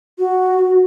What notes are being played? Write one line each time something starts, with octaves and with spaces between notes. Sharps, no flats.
F#4